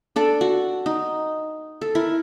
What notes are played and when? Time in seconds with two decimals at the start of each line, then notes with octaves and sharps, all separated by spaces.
0.16 D4 A4 D5
0.41 F#4
0.86 D#4
1.81 A4
1.95 E4 A#4